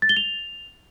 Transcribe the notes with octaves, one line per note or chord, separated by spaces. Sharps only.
A6
G7
F7